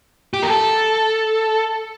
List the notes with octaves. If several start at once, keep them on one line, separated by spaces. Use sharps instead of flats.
G4
A#4
A4